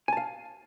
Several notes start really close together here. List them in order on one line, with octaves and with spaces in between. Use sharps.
G#5 A5 F5